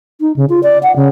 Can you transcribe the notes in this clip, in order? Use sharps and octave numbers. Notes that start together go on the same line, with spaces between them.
D#4
C#3
F4
D5
F#5
C#3